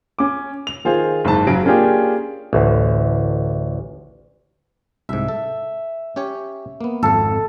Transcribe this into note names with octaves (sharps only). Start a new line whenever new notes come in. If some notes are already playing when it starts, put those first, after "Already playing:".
C#4 D6
F7
D#3 F4 G#4 C5
F#1 G#2 A5
F#1 C#3 F#3 D7
A#3 C#4 D4 F4 G4 G#4
A1 D2
C2 G#2 E5
A4
C#4 G4 C#5
A#3 B3
G#1 F2 A4 F5